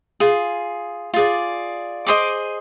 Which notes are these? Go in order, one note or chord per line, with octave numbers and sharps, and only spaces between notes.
F4 G#4
F4 G#4 D5
G#4 C5 D#5 D6